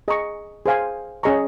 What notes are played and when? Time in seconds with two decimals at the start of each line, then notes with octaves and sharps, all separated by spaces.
0.08 G#4 D#5 A#5 C#6
0.66 G#4 C5 F5 G#5
1.23 C#4 G#4 D#5 A#5 C#6